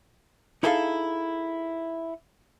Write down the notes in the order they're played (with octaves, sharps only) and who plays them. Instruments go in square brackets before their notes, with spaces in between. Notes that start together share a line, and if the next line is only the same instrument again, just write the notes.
[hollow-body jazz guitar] D#4 E4 G#4 A4 C5 F5